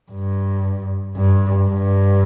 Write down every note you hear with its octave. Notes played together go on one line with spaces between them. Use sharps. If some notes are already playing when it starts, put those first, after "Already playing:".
G2
G2
G2